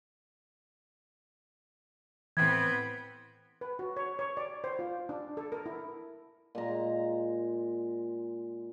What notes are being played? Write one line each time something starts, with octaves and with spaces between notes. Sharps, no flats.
A2 E3 B3 C4 G#6
B4
F#4
C#5
C#5
D5
C5
F4
D4
A4
A#4
E4
A#2 G#3 A#5